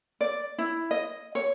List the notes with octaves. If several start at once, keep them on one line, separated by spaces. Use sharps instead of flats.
D5
E4
D#5
C#5